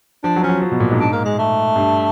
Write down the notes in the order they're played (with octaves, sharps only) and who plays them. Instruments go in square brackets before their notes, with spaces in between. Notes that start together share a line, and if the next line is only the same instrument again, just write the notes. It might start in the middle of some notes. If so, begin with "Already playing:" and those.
[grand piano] F3 [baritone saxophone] D4
[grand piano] F#3
[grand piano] F3 [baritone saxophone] C#4
[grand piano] F#3
F3
B2
A#2
G#2
[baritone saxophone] D4
A#3
G#3
A3
[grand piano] G2